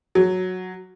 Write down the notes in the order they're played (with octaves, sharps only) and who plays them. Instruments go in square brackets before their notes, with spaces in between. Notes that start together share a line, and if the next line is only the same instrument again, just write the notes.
[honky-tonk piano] F#3